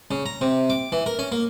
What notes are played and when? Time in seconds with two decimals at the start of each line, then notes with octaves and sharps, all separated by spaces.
0.11 C#3
0.26 A#5
0.41 C3
0.70 D6
0.92 E3
1.06 A#4
1.19 C#4
1.32 A#3